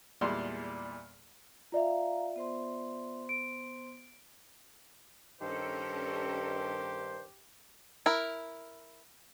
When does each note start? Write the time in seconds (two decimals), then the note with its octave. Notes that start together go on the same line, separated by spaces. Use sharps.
0.21 E2 A#2 G3 G#3 D5 C6
1.72 F4 D5 E5 F5 A#5
2.36 B3 C5 C6
3.29 D7
5.41 G2 D#3 C#4 G4 A4 A#4 C5
8.06 E4 A#4